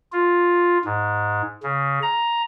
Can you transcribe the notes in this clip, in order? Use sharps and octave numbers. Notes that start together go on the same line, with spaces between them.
F4
G#2
C#3
A#5